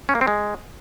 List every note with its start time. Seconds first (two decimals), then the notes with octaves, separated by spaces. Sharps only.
0.09 C#4
0.15 A#3
0.21 C4
0.27 G#3